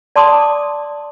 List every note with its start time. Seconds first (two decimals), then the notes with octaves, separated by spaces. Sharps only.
0.16 D5 A5 C6 D6 D#6